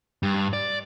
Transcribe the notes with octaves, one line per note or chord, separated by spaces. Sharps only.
G2
D5